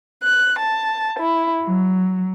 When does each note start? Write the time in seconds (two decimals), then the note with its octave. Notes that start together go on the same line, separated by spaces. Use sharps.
0.23 F#6
0.59 A5
1.19 E4
1.63 F#3